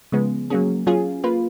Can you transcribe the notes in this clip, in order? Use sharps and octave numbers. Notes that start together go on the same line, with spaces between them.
C#3 F3 G#3 B3
F#3 A#3 C#4 G#4
F#3 C#4 F4 G#4
A#3 F4 B4